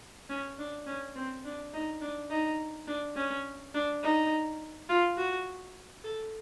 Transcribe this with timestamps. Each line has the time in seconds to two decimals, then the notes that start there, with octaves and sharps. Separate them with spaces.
0.29 C#4
0.59 D4
0.87 C#4
1.15 C4
1.45 D4
1.74 D#4
2.01 D4
2.30 D#4
2.87 D4
3.16 C#4
3.74 D4
4.03 D#4
4.89 F4
5.17 F#4
6.04 A4